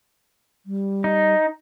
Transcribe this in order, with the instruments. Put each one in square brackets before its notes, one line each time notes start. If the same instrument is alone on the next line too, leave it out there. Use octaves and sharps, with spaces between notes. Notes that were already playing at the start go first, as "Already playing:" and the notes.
[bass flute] G3
[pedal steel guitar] D#4